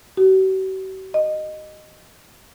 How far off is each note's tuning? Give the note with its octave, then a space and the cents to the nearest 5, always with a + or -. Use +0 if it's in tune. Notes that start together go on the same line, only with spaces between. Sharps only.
F#4 +45
D#5 -15